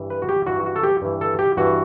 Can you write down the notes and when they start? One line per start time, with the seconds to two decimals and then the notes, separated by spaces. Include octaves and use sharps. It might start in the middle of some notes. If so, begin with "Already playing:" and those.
Already playing: G2 E3
0.10 B4
0.22 F#4
0.29 G4
0.46 G2 E3 F#4
0.66 F#4
0.76 A4
0.83 G4
1.02 G2 E3
1.21 A4
1.39 G4
1.57 G2 E3 F#4